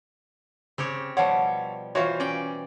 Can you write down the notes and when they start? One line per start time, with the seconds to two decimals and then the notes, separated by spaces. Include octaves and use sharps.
0.78 C#3 C4 G4 C#5
1.17 B2 F3 G3 C#5 F#5 A5
1.95 E3 F4 F#4 C5 C#5 F5
2.20 C#4 D5 G5